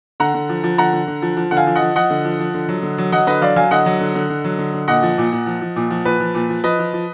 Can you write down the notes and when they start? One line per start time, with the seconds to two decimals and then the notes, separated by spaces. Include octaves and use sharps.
0.20 D3 F#5 A#5
0.34 D3
0.49 F3
0.64 F3
0.78 D3 F#5 A#5
0.93 D3
1.08 D3
1.22 F3
1.37 F3
1.51 D3 F#5
1.57 F5 G#5
1.67 F3
1.75 D#5 F#5
1.81 F3
1.95 F3 D#5 F#5
2.10 D3
2.25 F3
2.40 F3
2.54 D3
2.68 F#3
2.83 D3
2.98 F#3
3.12 F#3 D#5 F#5
3.27 D3 B4 D#5
3.41 F#3 D5 F5
3.56 F#3 F5 G#5
3.71 D3 D#5 F#5
3.86 F#3
4.01 D3
4.15 D3
4.30 D3
4.44 F#3
4.58 D3
4.73 D3
4.88 A#2 D#5 F#5
5.02 F3
5.18 A#2
5.32 A#2
5.46 F3
5.61 F3
5.76 A#2
5.91 F3
6.05 A#2 B4
6.20 F3
6.35 A#2
6.49 F3
6.63 F3 B4 D#5
6.79 F3
6.93 F3